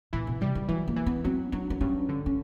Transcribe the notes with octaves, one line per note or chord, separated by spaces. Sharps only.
A#2 E3
B2
C3 G3
E3
E3 F#3
A#3
E3
B3
F#3 C4
F#3 D4
D4
G2 C#4
D3
C#4